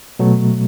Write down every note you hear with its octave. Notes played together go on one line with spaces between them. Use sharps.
B2 F#3 A3